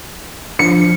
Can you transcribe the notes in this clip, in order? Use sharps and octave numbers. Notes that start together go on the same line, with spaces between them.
F3 D4 C#7